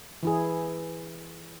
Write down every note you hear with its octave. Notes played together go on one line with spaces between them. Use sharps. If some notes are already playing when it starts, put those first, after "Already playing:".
E3 E4 G#4